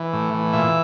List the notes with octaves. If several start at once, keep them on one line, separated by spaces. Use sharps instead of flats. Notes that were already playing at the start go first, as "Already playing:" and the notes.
Already playing: E3
A2
E3
A#2 E5